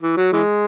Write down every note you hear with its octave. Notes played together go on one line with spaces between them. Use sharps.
E3
F#3
E3 G#3